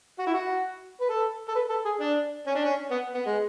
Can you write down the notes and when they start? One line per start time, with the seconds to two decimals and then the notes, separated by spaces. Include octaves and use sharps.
0.19 F#4
0.27 E4
0.34 F#4
1.01 B4
1.09 A4
1.48 A4
1.55 B4
1.70 A4
1.85 G#4
2.00 D4
2.46 C#4
2.55 D4
2.64 C#4
2.91 B3
3.14 B3
3.26 G#3